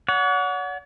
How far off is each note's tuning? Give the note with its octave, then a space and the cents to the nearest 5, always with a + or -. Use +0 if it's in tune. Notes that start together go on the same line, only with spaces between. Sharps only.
C#5 +45 F#5 -15